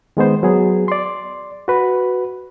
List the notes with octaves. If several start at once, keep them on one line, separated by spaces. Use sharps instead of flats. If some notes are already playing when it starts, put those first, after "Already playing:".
D#3 G#3 B3 C5
F#3 B3 G#4
D5 C6
F#4 B4 B5